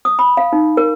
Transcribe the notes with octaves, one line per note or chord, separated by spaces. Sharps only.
D#6
B5
F5
D#4
A#4